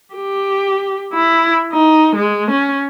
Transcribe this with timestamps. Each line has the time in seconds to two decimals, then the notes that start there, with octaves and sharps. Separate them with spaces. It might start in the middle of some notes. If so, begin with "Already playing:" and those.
0.15 G4
1.14 E4
1.73 D#4
2.15 G#3
2.51 C#4